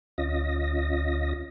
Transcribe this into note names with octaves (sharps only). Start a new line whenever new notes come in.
D2 C#4 F4 D#5 A#6